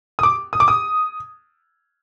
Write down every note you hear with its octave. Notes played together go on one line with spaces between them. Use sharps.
D#6
D6
D#6
D6
D#6